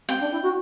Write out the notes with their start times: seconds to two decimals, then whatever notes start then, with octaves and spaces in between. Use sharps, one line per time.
0.09 C4 G5
0.20 D4
0.32 E4
0.43 F#4